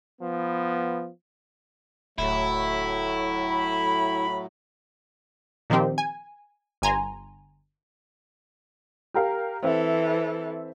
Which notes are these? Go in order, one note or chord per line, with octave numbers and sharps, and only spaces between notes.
F3 B3
D1 A2 F#3 A3 E4
B5
A#2 D#3 F3 C4 G4
G#5
G1 G#5 A#5 C6
G4 A#4 F5
E3 C4 A4 E5